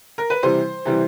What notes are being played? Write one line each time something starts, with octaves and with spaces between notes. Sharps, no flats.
A#4
B4
C3 E3 G3 C5
C3 E3 G3